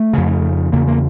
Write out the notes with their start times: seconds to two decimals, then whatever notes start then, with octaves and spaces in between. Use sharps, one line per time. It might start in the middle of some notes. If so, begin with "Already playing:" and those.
Already playing: A3
0.13 F2 C#3
0.72 E2 C#3 A#3
0.87 A#3